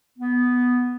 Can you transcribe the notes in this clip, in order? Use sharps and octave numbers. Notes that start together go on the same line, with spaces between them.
B3